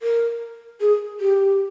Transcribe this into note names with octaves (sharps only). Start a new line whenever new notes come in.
A#4
G#4
G4